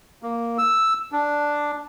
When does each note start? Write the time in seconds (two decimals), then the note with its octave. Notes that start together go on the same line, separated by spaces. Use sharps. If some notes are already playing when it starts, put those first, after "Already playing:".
0.23 A#3
0.58 E6
1.12 D4